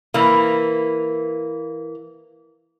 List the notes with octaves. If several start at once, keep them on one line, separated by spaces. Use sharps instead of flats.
E3 A#3